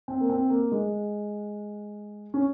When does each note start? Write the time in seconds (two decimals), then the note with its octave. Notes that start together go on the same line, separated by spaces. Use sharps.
0.08 C4
0.20 A#3
0.30 C4
0.50 A#3
0.72 G#3
2.34 C#4